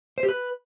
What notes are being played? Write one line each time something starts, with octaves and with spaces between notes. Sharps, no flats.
C5
G4
B4